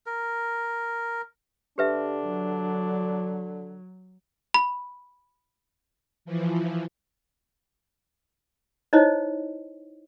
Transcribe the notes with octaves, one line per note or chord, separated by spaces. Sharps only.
A#4
D3 D4 G4 B4 E5
F#3
B5
E3 F3
D#4 E4 C5 C#5 D#5